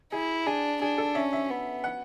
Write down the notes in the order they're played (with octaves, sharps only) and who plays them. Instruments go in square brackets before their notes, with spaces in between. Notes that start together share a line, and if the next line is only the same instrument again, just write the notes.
[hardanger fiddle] E4 [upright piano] G#4
[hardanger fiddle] D4 [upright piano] G#4
[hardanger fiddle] D4 [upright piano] G#4
[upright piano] A4
[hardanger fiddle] C#4 [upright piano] E5
[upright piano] E5
[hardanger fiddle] B3
[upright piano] F#5